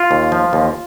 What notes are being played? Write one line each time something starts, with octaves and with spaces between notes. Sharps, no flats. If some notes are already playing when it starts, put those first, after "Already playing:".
Already playing: F4
D#2
F3
D#2